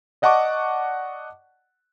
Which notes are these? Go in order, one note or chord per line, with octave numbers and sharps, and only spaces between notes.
D5 D#5 F#5 A5 C#6 D6